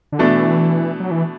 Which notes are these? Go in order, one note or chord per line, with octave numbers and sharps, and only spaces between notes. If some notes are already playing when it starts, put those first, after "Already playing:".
D3
B2 E3 A3 D4
F#3
E3